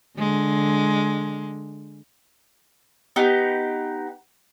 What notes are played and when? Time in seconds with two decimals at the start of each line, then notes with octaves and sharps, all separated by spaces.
0.17 D3 G#3
3.16 B3 D#4 G4